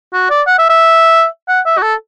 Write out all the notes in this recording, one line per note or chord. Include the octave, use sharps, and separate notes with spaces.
F#4
D5
F#5
E5
E5
F#5
E5
F#4
A4